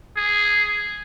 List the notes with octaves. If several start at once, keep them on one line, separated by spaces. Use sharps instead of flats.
G#4